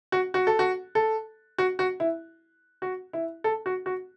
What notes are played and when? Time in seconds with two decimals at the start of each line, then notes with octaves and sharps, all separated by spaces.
0.12 F#4
0.34 F#4
0.47 A4
0.59 F#4
0.95 A4
1.58 F#4
1.79 F#4
2.00 E4
2.82 F#4
3.13 E4
3.44 A4
3.66 F#4
3.86 F#4